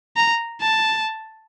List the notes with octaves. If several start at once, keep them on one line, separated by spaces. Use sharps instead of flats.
A#5
A5